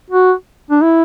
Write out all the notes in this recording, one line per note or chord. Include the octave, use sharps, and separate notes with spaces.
F#4
D4
E4